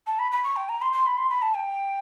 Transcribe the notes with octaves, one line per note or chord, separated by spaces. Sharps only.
A5
B5
B5
C#6
G5
A#5
C6
C6
B5
C6
B5
A5
G5